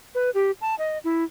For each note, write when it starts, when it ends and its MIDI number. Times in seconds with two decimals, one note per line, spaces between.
0.15 0.30 71
0.34 0.51 67
0.61 0.75 81
0.78 0.98 75
1.04 1.24 64